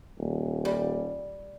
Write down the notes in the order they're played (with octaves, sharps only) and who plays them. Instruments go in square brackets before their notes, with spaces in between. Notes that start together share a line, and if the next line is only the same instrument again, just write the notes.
[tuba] D#1
[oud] G3